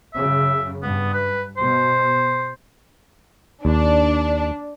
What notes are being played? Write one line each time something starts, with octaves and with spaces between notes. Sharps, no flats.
F#2 C#3 E5
G2 B3
B4
B2 C5
D#2 D4